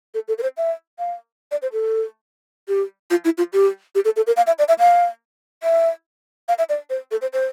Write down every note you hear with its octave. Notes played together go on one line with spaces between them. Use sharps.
A4
A4
A#4
C5
E5
F5
D5
C5
A4
G4
F4
E4
F4
G4
G4
A4
A4
A#4
F5
E5
D5
E5
F5
E5
F5
E5
D5
C5
A4
C5
C5